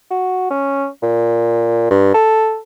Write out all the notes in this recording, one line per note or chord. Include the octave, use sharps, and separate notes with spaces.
F#4
C#4
A#2
G2
A4